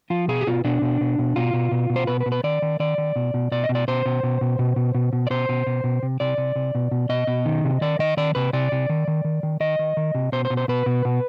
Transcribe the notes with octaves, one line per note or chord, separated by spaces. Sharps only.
F3 F4
B2 G#4
G4
B2 F4
B2 D4
B2
B2
B2
B2 F4
B2
B2
B2
C5
B2 B4
B4
B2
B4
D#3 D5
D#3
D#3 D5
D#3
B2
B2
B2 D5
D#5
B2
D5
B2 C5
B2
B2
B2
B2
B2
B2
B2
D5
B2 C5
B2
B2
B2
C3
C3 D5
C3
C3
B2
B2
B2 D#5
B2
D#3
C3
D#3 D5
D#3 D#5
D#3 D5
C3 B4
C3 D5
C3
D#3
D#3
D#3
D#3
D#3 D#5
D#3
D#3
C3
B2 C5
C5
B2
C5
B2 B4
B2
B2